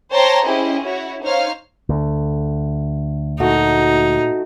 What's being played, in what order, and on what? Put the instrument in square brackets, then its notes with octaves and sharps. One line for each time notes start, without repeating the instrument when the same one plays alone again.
[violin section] C5 C#5 G5 A5 A#5 C6
C#4 E4 G4 G#4 C5 D#5
E4 F#4 C#5
D#4 C5 C#5 F5 F6
[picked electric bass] D2 [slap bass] D3
[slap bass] A#2 [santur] A3 F#4 [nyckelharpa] D#4